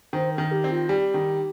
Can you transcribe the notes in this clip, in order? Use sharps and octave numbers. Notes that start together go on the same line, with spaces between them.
D#3 C5
A#4
D#3
G4
C4
F4
G3 G4
D#3